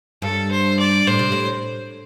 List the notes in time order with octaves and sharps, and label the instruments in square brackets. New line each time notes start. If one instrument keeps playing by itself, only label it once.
[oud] G2 [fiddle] A4
[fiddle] C5
D5
[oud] A2 [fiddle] C5
[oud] C3
A2